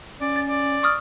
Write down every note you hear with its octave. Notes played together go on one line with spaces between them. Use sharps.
C#4 D5
A6
D5
C#6 D#6 F6